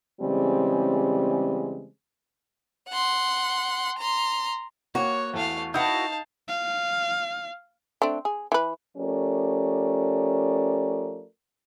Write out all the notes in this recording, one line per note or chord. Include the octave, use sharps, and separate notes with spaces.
C#3 E3 G3 G#3 C4 C#4
F#5 C6
A#5 C6
A#3 F#4 C#5
E2 A3 F5
D#4 E4 F#4 B4 F5 A5 D#6 G6
F5
A3 C4 D4
G#4
E3 B4
F3 A3 C#4 G4 A#4 D5